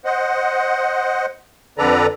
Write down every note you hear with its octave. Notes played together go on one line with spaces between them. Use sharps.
C5 D#5 F#5
F2 D3 A4 B4 D5 A#5